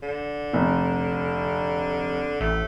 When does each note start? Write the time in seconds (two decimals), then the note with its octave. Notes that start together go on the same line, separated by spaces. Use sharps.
0.02 D3
0.53 F1
2.41 A1 A3